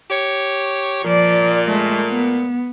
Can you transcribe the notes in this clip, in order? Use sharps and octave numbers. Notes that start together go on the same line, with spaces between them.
G4 C#5
A#2 F3 D5
G#3 A3
B3